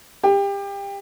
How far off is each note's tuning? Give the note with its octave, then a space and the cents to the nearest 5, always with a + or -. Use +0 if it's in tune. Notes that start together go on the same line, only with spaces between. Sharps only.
G4 +25